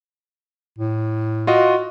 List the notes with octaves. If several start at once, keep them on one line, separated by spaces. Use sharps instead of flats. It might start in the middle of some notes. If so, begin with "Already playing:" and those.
A2
F4 F#4 D#5